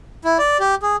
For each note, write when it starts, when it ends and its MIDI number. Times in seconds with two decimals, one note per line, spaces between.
0.25 0.38 64
0.38 0.57 74
0.60 0.75 67
0.83 0.96 68